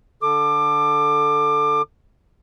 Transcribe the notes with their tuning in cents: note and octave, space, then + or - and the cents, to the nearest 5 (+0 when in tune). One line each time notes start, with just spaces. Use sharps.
D3 +0 A4 +0 D6 +25